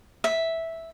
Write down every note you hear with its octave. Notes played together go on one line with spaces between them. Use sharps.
E5